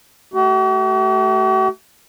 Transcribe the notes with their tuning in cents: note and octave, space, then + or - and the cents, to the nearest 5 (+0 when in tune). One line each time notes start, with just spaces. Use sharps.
A3 -10 F#4 +45